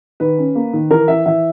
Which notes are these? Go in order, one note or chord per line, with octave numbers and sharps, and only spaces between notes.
D#3 B4
C#4
A#3
D#3
E3 A#4
E3 E5
E3 E5